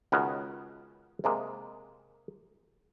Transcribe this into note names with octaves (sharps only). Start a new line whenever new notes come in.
C#2 D#3 B3 C#4 F#4
C3 G#3 A#3